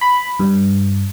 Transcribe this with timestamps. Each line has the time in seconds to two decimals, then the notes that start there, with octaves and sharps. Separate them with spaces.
0.01 B5
0.39 G2